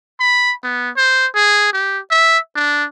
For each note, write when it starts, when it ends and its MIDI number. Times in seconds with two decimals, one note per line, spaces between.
0.20 0.53 83
0.63 0.90 59
0.97 1.27 72
1.35 1.72 68
1.73 1.99 67
2.11 2.38 76
2.56 2.85 62